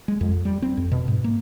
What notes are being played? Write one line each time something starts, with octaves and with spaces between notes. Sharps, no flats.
G#3
F2
G3
C4
F2
B2
G#2
A#3